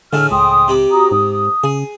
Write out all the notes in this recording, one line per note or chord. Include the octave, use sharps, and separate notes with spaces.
A2 D3 G#3 E4 E6 F6
C#2 G5 C6 D#6
C3 B5 D6
F#4 A#5 D#6
G#2 D#6
C#3 G#4